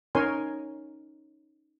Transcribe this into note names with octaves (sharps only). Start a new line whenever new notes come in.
C#4 D#4 A#4 C#5 G#5 C6